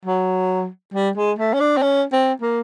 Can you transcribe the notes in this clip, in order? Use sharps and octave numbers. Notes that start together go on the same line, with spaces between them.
F#3
G3
G#3
A3
C#4
D4
C4
C#4
C4
A#3